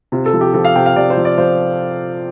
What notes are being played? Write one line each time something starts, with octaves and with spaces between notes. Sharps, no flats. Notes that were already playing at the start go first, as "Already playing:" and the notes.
C3 F4
A4
F3
G4
F3 A4
F5
C3 G5
F5
C3 D5
C5
F3
D5
F3 C5